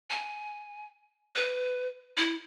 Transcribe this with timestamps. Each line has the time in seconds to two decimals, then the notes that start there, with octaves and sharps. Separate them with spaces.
0.10 G#5
1.35 B4
2.17 E4